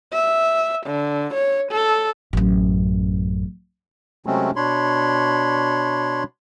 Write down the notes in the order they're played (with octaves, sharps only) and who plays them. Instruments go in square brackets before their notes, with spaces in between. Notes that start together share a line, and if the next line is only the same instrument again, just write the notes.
[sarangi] E5
D3
C#5
A4
[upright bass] A1 F#2
[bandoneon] C3 F#3 G#3 A3 C4 C#4
B2 D4 C#5 B5 C6